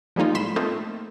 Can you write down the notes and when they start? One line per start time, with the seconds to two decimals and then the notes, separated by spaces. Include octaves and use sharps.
0.16 F3 G3 G#3 A#3 D#4 F4
0.35 A2 B5 C6 E7
0.56 A3 A#3 C4 D#4 F4